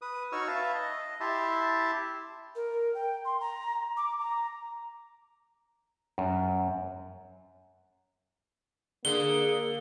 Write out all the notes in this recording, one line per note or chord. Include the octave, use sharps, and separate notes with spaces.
B4 D#6
D#4 F#4 C#5 C#6 E6 F6
B4 E5 F5 A5
D#5
E4 G4 E5 A5 C6
A#4
G5
C6
A#5
D6
A#5
F#2
D3 A#3 G#4 G7